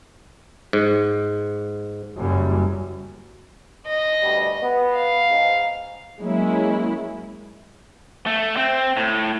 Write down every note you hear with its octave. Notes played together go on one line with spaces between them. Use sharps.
G#2
F#1 F#2 G3
D#5
D2 B2 G3
B3
F5
G#2
F#3 G#3 A#3 C#4 E4
A3
C4
A2